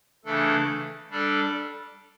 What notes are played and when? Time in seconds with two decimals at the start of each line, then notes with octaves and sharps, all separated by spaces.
0.25 C#3 E3 A3 D4 A4
1.11 G3 D4 A4 D5